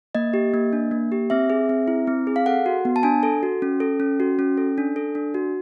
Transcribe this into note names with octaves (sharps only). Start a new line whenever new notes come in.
A#3 D#5
G4
A#3
D4
A#3
G4
C4 E5
G#4
C4
E4
C4
G#4
F5
A4 F#5
F#4
B3
A5
D4 G#5
A4
F#4
C#4
A4
C#4
F#4
C#4
A4
D4
A4
D4
F#4